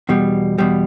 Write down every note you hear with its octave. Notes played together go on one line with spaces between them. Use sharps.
E2 B2 G3
E2 B2 G3